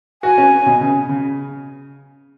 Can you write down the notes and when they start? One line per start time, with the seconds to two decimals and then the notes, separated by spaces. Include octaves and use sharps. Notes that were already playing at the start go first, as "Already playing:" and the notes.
0.23 F#4 G#5
0.38 C#4
0.66 B2
0.81 C#3
1.09 C#3